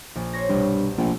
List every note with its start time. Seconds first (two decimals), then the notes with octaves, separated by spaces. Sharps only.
0.15 A#1
0.33 C5 C#5 A#6
0.49 C2 G2 B2
0.98 A#1 B2 A3